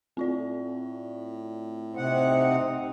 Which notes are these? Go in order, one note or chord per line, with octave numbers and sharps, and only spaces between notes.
A2 C4 F4 D5
C3 C4 D#4 F#5